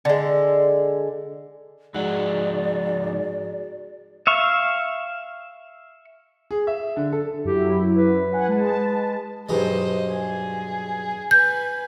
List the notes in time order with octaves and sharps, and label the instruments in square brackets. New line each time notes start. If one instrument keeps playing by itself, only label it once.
[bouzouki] D3 G#3
[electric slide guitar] G#2 F3 F#5 [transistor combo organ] G#3 D#4 [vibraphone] F#4 G#4 [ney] D5
[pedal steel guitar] E5 F5 C#6
[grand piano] G#4
E5
D3
A4
[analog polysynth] F#2 F#3 E4 [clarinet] G4
[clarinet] B4
[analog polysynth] F#5 G#5
G#3 A5
[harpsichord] B1 G2 G#3 [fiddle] C5 D#5
[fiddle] G#4
[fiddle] B4 G#5 [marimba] G6